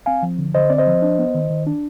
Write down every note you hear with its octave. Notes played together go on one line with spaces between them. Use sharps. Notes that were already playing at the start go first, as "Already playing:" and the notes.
C4 F5 G#5
F3
D3
D3 C5 D#5
C4 D5
C5 D#5
F3
D4
B3
D#3
D#3
D4